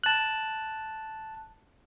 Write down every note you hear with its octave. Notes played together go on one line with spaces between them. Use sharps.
A5 F#6